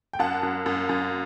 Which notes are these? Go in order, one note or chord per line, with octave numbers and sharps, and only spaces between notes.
G5
F#2 F#5 A5
F#2
F#2
F#2